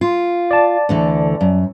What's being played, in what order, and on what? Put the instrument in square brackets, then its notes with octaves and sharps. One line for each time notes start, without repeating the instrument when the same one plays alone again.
[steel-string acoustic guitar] F4
[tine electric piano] D5 A5
[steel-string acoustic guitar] D2 D3 E3
F#2